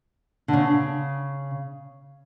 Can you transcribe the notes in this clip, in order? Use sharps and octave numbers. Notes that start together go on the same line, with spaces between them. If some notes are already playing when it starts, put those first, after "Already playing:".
D3
C#3